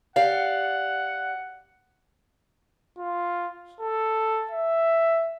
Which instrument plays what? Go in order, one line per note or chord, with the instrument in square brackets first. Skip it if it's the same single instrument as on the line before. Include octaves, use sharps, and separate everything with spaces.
[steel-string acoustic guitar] G4 D5 F5 [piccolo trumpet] F#5
[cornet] F4
A4
E5